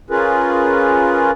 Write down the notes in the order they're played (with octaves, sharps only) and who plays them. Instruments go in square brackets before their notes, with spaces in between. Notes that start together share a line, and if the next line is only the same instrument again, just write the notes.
[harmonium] C#4 F4 G#4 A#4 B4